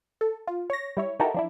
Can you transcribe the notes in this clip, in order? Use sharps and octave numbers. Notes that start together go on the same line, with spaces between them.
A4
F4
C#5 A#6
G3 E4 C#5
D#4 E4 F#4 G4 A4 A#4
F3 D4 E4